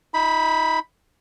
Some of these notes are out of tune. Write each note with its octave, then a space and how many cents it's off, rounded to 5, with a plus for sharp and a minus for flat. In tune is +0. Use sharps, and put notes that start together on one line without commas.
D#4 +35 B5 +0